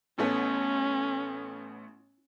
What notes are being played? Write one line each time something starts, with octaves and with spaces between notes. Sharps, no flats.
A1 A3 B3 C#4